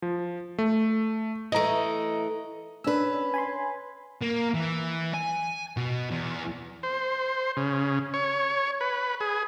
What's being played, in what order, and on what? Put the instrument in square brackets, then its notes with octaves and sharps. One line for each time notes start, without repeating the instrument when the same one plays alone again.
[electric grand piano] F3
A3
[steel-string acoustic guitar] E3 A3 [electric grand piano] D#5 A#5
[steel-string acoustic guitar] C#4 B4 [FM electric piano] D4 E6
[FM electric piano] G#5 B5 C6
[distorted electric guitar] A#3
E3
G#5
B2
E2
[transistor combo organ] C5
C#3
C#5
B4
G#4